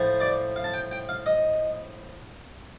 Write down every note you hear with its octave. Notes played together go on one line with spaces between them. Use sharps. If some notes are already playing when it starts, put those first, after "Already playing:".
Already playing: A2 F3
D5
F5
A5
G5
G5
F5
D#5